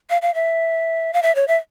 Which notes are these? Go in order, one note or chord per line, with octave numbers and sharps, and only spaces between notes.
F5
F5
E5
F5
E5
C#5
E5